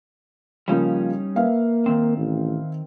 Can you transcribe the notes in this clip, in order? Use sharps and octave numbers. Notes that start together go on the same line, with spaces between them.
C#3 F3 G3 A#3 C#4 D#4
A#3 B4 E5 F5
D#3 C4
A1